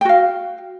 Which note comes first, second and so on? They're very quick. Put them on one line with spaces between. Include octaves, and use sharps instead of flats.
G5 F#4 F5